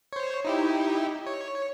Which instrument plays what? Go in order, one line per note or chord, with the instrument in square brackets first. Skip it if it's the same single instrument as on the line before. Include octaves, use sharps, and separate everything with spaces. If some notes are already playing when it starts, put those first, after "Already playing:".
[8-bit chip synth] C5 C#5
D#4 E4 G4
C#5